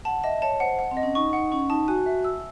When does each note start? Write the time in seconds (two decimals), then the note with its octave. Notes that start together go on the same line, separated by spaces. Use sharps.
0.05 F#5 A5
0.23 D#5 E5
0.42 C#5 A5
0.60 C5 F#5
0.79 F#5
0.91 C4
0.97 D#5
1.03 C#4
1.15 D#4 C#6
1.33 D#4 F#5
1.52 C#4 C#6
1.70 D#4 A5
1.88 F#4 G#5
2.06 E5
2.24 E6